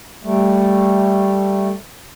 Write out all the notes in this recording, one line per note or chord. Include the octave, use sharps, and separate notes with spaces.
G3 A3